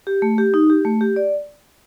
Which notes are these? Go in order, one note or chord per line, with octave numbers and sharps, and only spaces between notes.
G4
A3
G4
D#4
G4
A3
G4
D5